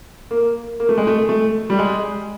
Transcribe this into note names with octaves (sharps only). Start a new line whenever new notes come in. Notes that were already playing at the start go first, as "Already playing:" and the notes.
A#3
A#3
A3
G#3
A3
A3
G3
G#3